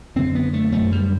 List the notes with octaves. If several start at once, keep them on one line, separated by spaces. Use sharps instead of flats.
F#2 D3 C4
B3
A3
F#2 D3 A3
G3